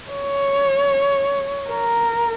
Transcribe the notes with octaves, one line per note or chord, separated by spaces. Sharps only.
C#5
A#4